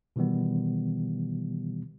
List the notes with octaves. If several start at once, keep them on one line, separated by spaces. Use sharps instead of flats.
B2 D#3 E3 G3 B3